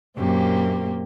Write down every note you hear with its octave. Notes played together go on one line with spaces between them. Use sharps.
F#2 A#2 A#3 C4 G4